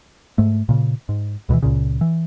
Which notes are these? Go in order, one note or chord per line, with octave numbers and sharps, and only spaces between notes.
G#2 A3
A#2 C#3
G#2
D2 B2 D3 E3
C#2 A#2 C#3
E3